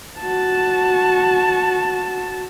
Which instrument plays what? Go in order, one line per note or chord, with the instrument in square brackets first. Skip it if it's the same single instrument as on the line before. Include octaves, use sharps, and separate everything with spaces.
[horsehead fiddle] F#4 A5